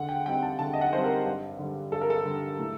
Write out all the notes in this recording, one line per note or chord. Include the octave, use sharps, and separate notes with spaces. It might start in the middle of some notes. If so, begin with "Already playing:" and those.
Already playing: D3 F#5
G5
G3 C4 D#4 G5
A5
D3 A5
D#5
F#5
G3 C4 D#4 C5
A#4
G2
D3 G3
G2 A4
A#4
A4
D3 G3
A2